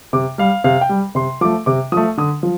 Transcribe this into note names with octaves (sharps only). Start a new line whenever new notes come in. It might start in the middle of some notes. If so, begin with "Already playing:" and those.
C3 D6
G3 F5
C3 F5
G5
G3
C3 C6
F3 A3 D6
C3 D6
F3 A3 D#6
D3 D#6
F3